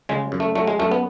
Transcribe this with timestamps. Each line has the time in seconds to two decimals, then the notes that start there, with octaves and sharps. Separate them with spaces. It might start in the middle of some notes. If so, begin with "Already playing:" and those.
0.09 C#3 G#3
0.32 F#2
0.40 A3
0.55 F#3 A3
0.67 G#3
0.79 F#2 A3
0.92 B3